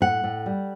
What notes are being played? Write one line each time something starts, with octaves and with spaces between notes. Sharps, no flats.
A2 F#5
A2
G3